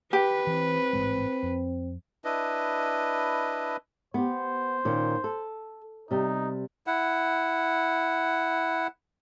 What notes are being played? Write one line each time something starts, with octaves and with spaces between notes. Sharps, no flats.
G4 B4
E3 C4
A1 G#2 G#3
F2
D4 E4 B4 D#5
B3 G4 C5
A#2 D#3 C#4
A4
C3 G3 D#4
E4 F#5